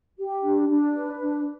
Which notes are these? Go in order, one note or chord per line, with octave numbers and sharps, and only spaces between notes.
G4
D4
D4
B4
D4